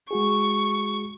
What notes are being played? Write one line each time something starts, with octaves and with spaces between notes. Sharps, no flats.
G#3 F#4 G#4 C#6